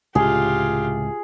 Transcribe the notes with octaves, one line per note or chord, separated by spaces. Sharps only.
C#2 A2 C3 F4 G4 G#4